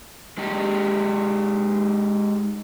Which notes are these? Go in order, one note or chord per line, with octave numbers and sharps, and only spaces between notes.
G#3 D#4 G4